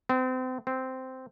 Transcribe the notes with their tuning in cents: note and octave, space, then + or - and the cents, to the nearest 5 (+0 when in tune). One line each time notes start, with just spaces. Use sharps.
C4 -35
C4 -10